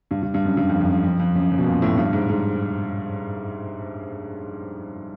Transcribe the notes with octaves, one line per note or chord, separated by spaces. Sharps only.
G2
G2
G2
F#2
G2
F2
F#2
F#2
F2
F2
F#2
F#2
B2
A#2
A2
G2
G#2
G#2